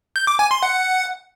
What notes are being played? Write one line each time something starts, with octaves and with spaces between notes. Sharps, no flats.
G6
D6
G#5
C6
F#5